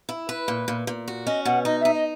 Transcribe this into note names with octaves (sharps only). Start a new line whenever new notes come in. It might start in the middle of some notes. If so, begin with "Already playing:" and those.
E4
B4
A#2
A#2
A#2
F#4
C#4 D#5
B2 F#5
D#4 D#5
D#4 E5
D#5